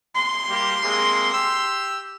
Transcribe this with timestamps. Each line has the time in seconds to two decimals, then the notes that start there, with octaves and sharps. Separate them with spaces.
0.15 C6
0.49 G3 A#3 G4
0.83 G#3 A#3 C4
1.33 G4 E6